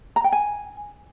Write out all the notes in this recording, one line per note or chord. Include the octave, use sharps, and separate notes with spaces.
A#5
G5
G#5